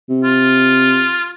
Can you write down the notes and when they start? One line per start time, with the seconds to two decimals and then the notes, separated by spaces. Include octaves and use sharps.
0.09 C3
0.24 F4